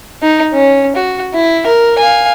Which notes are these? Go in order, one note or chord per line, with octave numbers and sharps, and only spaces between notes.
D#4
C#4
F#4
E4
A#4
F5 G#5